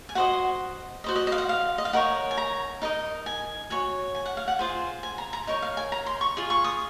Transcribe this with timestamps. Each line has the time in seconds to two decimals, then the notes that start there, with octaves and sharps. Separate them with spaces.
0.09 G#5
0.15 F#4 C5 D#5 F#5
1.04 F#4 C5 D#5
1.16 D#5
1.27 D#5
1.32 F5
1.38 F#5
1.49 F5
1.78 D#5
1.85 F5
1.93 D#4 A#4 C#5 F#5
2.31 G#5
2.37 A#5
2.82 D#4 A#4 D#5
3.26 G#5
3.70 F#4 C#5 G#5
4.15 G#5
4.25 F#5
4.37 F5
4.48 F#5
4.59 F4 G#4 C5 G#5
5.03 G#5
5.18 A#5
5.33 A#5
5.47 D#4 A#4 C#5
5.62 F5
5.77 G#5
5.92 A#5
6.06 C6
6.21 C#6
6.37 F4 G#4
6.50 C#6
6.64 D#6